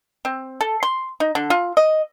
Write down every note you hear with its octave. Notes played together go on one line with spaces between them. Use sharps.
C4
A4
C6
D#4
D3
F4
D#5